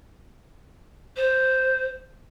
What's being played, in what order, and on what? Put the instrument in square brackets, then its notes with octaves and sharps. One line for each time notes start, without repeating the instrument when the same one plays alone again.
[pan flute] C5